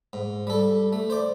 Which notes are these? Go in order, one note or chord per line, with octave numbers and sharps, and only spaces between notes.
G#2
G3 A4
A3
C5 D5